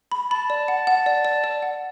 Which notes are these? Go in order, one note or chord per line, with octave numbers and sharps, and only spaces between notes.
B5
A5 B5
D5
F#5
F#5
D5
D5
D5
F#5